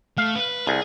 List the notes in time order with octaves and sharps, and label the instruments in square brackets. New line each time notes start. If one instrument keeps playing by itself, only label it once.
[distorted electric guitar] A3 [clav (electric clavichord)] F5
[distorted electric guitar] B4
[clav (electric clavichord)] C2 [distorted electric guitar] G#4